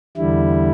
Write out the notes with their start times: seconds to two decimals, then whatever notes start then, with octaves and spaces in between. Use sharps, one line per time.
0.17 E2 D3 G3 E4